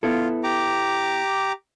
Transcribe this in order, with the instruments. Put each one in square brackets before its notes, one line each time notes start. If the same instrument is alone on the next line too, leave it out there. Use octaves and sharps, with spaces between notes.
[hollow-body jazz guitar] B3 E4 A4 [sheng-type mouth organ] F4
[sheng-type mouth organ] G4 A#5 D6